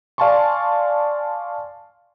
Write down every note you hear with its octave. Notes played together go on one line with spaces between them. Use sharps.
D5 F5 G#5 A5 C6 C#6